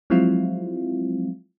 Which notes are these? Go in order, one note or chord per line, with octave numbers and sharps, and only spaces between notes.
F3 F#3 G#3 C4 E4 F4